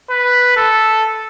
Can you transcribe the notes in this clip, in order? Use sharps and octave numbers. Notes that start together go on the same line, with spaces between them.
B4
A4